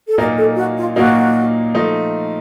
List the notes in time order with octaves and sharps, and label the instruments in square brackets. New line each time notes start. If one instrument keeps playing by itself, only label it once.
[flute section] A4
[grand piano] A#2 F#3 A#3 D#4 [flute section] A#4
[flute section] A4
F#4
F4
[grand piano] A#2 F#3 A#3 D#4 [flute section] F#4
[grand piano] F3 A3 D#4